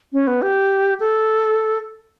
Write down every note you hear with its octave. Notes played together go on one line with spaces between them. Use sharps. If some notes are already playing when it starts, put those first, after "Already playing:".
C#4
B3
G4
A4